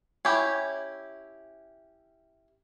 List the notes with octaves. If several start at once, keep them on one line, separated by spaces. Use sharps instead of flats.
C#4 E4 G4